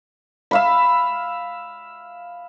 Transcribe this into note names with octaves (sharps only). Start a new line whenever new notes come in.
E5 F5 B5